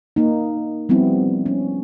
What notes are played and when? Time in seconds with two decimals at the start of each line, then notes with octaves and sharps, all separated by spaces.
0.16 A#3 D#4
0.89 F3 G3 B3 C4 E4
1.46 C#4